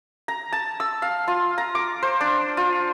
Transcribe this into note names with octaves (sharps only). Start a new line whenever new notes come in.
A#5
A5
E6
F5
F4
A#5
D6
C5
D4
F4